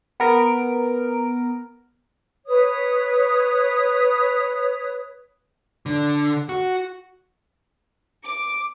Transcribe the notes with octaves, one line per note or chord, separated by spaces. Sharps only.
B3 A#4 D7
B4 C#5 D#6
D3
F#4
D6